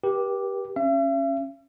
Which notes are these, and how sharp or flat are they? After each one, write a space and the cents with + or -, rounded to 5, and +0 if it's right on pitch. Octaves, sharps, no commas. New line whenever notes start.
G4 +0 B4 -45
C#4 -15 E5 +45